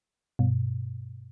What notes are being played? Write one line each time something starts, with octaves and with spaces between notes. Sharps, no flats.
G2 B2